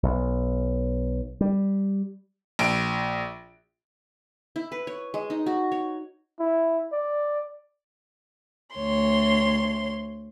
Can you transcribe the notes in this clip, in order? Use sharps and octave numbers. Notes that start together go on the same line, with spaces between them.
B1
G3
A#1 D7
E4
B4
C#5
G#3
D#4
F#4
C#5
E4
D5
D2 C#5 C6